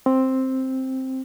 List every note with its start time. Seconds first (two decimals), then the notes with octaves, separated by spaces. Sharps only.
0.06 C4